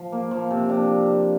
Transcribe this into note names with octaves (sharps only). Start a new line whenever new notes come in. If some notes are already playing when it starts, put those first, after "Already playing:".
Already playing: F3
A#3
F3
C3
D4